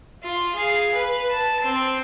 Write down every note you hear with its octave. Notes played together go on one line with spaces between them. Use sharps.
F4
G#4 F5
B4
A5
C4